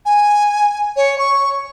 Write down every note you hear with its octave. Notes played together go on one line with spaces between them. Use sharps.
G#5
C#5
C#6